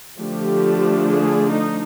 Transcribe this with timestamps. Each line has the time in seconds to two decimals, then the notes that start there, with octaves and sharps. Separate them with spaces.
0.20 D3 F3 A3 D4 G4
1.07 G#4
1.50 D#4